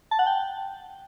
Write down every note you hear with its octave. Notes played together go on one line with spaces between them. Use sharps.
A5
F#5
G5